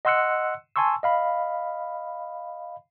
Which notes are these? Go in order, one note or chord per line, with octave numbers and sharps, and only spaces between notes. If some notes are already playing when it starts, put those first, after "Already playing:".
D#5 F#5 C6 E6 F#6 C#7
G#5 A5 C6 C#6 E6
D#5 F5 B5